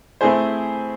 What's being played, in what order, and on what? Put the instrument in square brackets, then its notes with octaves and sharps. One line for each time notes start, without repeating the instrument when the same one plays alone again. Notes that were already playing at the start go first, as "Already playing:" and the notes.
[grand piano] A3 C4 E4 G#4 C5